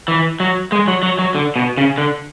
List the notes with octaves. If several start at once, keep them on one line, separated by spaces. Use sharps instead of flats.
E3
F#3
G#3
F#3
F#3
F#3
D3
B2
C#3
D3